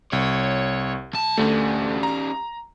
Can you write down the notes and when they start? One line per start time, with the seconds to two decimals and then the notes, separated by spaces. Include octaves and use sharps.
0.13 C2 C#5
1.13 B1 A5
1.38 D2 G3 A3 C#4
2.03 A#5